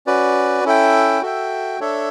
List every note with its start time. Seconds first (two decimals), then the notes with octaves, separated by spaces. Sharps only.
0.07 C#4 F#4 B4 D5
0.64 C#4 E4 A4 E5 G5
1.22 F#4 A4 E5 G5
1.80 D4 A4 C#5 E5